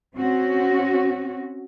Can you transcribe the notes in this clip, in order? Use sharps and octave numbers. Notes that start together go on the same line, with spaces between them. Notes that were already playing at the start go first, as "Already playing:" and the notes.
C4 C#4 F#4